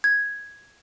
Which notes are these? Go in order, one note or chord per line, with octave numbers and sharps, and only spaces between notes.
G#6